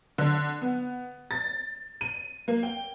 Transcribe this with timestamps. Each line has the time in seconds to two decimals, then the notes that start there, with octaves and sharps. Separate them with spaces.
0.18 D3
0.62 B3
1.31 A6
2.01 D#7
2.48 A#3
2.63 G5